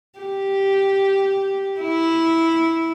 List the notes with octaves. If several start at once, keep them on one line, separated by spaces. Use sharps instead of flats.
G4
E4